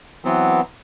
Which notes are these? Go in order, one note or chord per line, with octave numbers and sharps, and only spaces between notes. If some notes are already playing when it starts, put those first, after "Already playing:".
E3 F#3 B3 C4